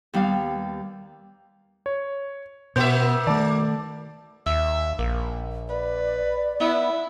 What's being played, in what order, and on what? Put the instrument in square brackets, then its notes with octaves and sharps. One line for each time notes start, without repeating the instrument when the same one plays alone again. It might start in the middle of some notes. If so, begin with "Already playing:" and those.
[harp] D#2 G3 B3 F5
[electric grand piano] C#5
[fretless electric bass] B2 [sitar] A#3 F#4 E5 [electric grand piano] G6
[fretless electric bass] D#3 A3 [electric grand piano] D5 A5 D6
[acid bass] D#2 [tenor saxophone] E5
[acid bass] A#1 [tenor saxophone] A#3
[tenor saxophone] B4 [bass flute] D5
[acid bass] B3 [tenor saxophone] E4